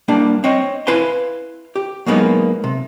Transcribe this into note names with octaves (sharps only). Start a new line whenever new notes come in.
G3 A#3 D4
C4 C#5 D#5
E4 B4 F5 G#5 C6
G4
F#3 G#3 A#3 B3 D#4
C3